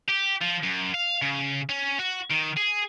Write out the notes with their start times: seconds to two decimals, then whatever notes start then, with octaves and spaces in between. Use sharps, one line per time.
0.08 G4
0.41 F3
0.63 F#2
0.94 F5
1.22 C#3
1.69 C#4
1.99 F#4
2.30 D#3
2.56 G#4